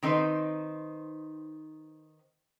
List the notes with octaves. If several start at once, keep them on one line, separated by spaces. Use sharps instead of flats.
D#3 C4 D#4 B4 C5